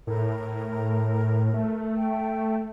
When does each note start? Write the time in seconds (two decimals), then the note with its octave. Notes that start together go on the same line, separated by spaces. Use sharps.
0.07 A2 A#4
1.54 A3
1.97 G5